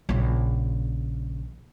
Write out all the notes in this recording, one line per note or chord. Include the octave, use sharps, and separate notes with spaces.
A#1 C#3